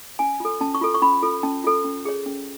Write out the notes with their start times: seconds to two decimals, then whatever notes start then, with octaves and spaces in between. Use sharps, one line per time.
0.19 C#4 G#5
0.40 F4 A4
0.61 C#4 A5
0.75 C#6
0.81 F4 A4
0.94 C#6
1.02 C#4 B5
1.22 F4 A4
1.43 C#4 A5
1.64 F4 A4
1.85 C#4
2.05 G#4 C#5
2.26 C#4